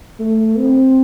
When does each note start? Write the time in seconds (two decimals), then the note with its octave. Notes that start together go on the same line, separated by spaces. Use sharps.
0.20 A3
0.58 C4